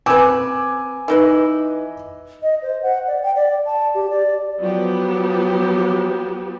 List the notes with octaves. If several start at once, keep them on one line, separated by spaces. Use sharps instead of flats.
C4 B4 G#5 D6
E3 D#4 B4
D#5
C5
F#5
D5
G5
D5
A5
G4
D5
F3 F#3 B3 G4